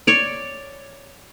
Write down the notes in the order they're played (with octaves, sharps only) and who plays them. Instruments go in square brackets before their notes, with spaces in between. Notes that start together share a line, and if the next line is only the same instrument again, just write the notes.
[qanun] C#5 D5